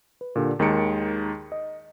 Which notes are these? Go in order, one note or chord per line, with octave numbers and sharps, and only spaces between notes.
B4
A#2 D3 G4
D#2 D#3 G#3 A#5 C#7 D7
D#5